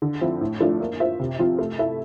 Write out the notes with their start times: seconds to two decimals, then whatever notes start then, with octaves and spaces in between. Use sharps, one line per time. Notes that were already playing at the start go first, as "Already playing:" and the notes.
0.02 D3
0.21 F3 C4 E4
0.41 A2
0.61 F3 A3 D4 F4
0.80 A#3
1.00 F4 C5 E5
1.20 C3
1.39 F3 C4 F4
1.59 A3
1.78 E4 A4 E5